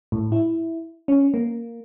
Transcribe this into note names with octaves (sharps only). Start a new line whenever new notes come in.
A2
E4
C#4
A#3